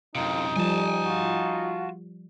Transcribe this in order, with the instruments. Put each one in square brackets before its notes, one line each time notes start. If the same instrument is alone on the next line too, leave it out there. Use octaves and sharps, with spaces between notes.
[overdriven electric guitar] F#2 C3 [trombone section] A2 D#3 F4 [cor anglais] D#4
[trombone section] F2 [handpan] F3 G3 [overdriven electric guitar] G#5 A5
[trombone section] F4 F#4